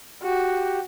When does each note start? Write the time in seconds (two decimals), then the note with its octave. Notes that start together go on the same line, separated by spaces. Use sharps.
0.23 F#4 G4